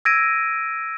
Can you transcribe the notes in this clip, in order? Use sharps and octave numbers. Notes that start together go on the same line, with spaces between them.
E6 G#6 A#6 D7 D#7